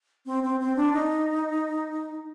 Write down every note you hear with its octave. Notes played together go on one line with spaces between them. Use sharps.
C4
C4
C4
D4
D#4